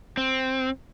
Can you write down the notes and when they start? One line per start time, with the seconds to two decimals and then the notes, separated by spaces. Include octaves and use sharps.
0.17 C4